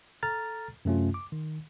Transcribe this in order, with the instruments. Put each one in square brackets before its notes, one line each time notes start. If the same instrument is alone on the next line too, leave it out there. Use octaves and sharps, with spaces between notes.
[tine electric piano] A4 A#5 F6 A6
F#2 C3 A3 C#4 F4
D6
D#3